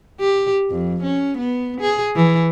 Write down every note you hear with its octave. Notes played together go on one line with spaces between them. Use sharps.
G4
F2
C#4
B3
G#4
E3